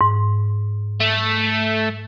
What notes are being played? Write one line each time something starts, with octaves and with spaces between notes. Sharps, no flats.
G#2
A3